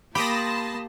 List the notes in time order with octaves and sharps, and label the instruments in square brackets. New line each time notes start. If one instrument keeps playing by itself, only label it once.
[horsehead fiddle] A#3 [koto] G4 [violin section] A5 C6 [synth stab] B5 D#6 A#6